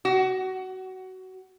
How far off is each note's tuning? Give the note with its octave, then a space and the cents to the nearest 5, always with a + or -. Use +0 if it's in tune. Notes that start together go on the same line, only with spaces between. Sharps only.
F#4 +20